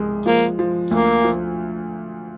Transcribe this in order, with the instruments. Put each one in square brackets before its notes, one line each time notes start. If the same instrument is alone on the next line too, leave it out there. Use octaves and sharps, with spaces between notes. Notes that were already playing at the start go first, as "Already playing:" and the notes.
Already playing: [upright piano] C2 G#3
[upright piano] F3 [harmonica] A#3
[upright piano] F3
[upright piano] D2 [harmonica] A#3
[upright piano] F3